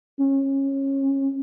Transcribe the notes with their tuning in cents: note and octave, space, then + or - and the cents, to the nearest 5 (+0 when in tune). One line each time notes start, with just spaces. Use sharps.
C#4 -25